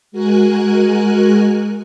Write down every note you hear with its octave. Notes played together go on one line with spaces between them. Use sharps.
G#3 F#4 A#4 G#5 F#6